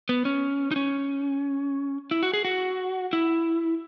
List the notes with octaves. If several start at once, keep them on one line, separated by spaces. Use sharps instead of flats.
B3
C#4
D#4
C#4
E4
F#4
G#4
F#4
E4